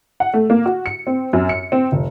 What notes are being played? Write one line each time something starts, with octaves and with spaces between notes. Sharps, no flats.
F#5
A3
A#3
F#4
C#7
C4
F#2
C#7
C4
F1